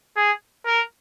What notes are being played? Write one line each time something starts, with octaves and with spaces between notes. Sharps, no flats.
G#4
A#4